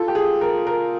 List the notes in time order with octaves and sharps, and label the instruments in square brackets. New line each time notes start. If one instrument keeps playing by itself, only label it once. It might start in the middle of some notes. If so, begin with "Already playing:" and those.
Already playing: [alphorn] F4 [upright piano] A4
[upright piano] G4
G#4
A#4
A#4